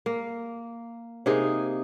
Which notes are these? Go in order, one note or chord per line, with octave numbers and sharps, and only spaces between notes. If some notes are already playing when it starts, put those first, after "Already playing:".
A#3
C3 A#3 D#4 G#4